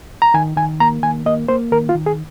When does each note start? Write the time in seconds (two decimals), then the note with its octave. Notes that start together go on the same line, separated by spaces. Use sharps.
0.22 A#5
0.34 D#3 G#5
0.57 D#3 G#5
0.80 A#3 A#5
1.03 D#3 G#5
1.26 A#3 D#5
1.48 A#3 C5
1.72 D#3 A#4
1.89 F4
1.95 D#3
2.06 G#4